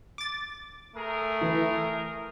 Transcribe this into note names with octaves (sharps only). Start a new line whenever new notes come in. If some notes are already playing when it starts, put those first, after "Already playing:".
D6 A6
A3 G#4 A#4
E3 E4